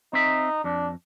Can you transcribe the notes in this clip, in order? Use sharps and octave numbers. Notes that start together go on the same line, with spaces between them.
C4 D#4 E5
F2 D4